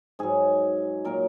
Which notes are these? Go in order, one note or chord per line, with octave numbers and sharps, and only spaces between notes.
G#2 F#3 G#4
A#2 F#3 A#4